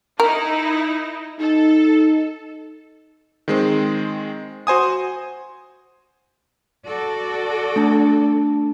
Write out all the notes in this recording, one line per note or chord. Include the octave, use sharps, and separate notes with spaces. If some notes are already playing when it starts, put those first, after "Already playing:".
D#4 E4 A#4
D#4 A4
D#3 G#3 C4
F#4 C5 G#5 D#6
F#4 A4 D5
A3 D4 A5